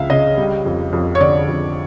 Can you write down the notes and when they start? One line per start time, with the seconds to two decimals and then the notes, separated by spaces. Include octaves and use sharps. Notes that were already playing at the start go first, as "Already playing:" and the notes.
Already playing: C#2 F3 E5 F5
0.10 C#3 D#5
0.37 G3
0.65 F2
0.93 F2
1.15 C#5
1.21 D3 D5
1.49 F2